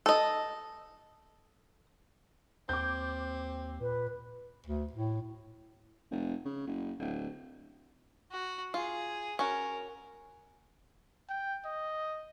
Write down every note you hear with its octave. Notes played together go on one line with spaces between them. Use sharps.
A4 D#5
D#2 C4 D6 G6
A#2 B4
D2
A2
F1
C#3
F#1
D1
F#4
F4 G#4
C#4 F#4 A#4
G5
D#5